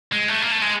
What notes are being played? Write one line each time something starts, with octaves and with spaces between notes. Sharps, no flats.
G#3
A3
A#3
A3
G#3